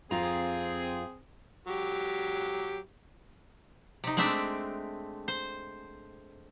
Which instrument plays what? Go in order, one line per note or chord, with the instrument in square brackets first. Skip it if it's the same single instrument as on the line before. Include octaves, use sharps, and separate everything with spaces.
[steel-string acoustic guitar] F2 F4 A#5 [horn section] C4 G#4
[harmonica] F#3 G4
[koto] C3 D#4
G#3 A3 C4 D4 E5
C5